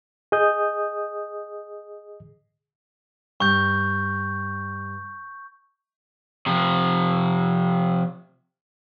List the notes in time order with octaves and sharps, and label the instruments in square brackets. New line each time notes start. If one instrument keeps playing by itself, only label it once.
[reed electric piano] G#4 D#5 D#6 G6
[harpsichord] G2 [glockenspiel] C#6 G6
[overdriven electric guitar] C3 F3